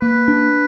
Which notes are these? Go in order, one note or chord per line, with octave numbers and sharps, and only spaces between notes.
A#3 B4
D4